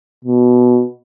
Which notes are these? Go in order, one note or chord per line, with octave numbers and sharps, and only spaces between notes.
B2